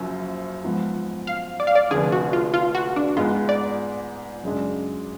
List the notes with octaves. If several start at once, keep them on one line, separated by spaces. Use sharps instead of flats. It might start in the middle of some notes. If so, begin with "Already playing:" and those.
Already playing: F#1 F#2 F3
G#2 F3 B3
F5
D5
F5
D5
F1 F2 D3 G#4
F#4
F4
F4
F#4
D4
G#2 G#3 B3 F4
D5
F#2 C#3 G#3 D4